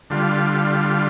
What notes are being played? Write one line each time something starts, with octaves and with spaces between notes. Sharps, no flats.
D3 G3 F4